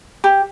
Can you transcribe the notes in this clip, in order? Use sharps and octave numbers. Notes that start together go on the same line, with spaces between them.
G4